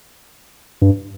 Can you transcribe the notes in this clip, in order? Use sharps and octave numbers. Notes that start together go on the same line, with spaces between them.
G2